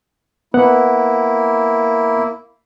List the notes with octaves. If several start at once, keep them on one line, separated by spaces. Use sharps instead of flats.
A#3 B3 E4 F#5